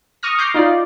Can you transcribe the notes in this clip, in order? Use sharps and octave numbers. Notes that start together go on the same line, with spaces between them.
C#6 D#6 F6 A#6
D6 F6 G6 A#6 C7
D#4 F4 D5